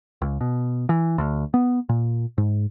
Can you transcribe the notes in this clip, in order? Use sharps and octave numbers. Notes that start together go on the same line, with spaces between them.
C#2
B2
E3
D2
B3
A#2
G#2